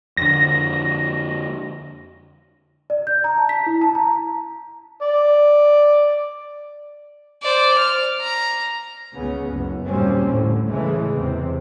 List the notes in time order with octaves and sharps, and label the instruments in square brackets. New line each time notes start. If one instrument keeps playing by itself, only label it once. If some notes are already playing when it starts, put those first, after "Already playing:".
[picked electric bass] F2 D3 [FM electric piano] A#6
[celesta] D5
G6
A#5
A5
B6
E4
A5
A#5
[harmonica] D5
[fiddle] C5 D5
F6
A#5
[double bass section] C#2 C#3 B3 C#4
F#1 F#2
D#2 A#2 G3 C4 C#4
A2 D3
C#3 E3 G#3 A3
E2 C3 C4